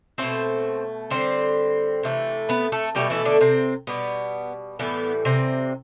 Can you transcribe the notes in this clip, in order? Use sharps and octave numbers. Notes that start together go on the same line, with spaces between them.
B2 A3 C4 C5
D3 G3 C4 C5
C3 E3 A3
B3 B4
A3 A4
B2 F#3 G3 A3 G4
E3 E4
D3 D4
C3 C4
B2 G3 B3
A2 E3 G3 B3
C3 C4